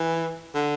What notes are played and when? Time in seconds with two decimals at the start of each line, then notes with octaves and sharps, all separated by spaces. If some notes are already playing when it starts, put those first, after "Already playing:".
Already playing: E3
0.54 D3